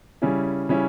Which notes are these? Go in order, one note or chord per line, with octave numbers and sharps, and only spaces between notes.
C#3 G3 C#4 E4
C#3 G3 C#4 E4